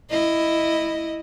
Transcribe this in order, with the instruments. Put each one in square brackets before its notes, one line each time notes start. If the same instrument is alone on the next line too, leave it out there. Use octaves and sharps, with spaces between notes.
[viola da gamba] E4 D#5